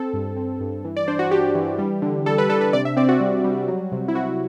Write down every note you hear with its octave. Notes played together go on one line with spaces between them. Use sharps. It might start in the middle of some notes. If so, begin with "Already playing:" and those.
Already playing: C4 A4
G2
C4
G2
E3
D5
D4 C5
F#4
D4 G4
E3
G3
D3
G3 A4
B4
D4 A4
B4
C3 D5
E5
C4 D5
F#4
G3
G3
F#3
C3
E4
C3 F#4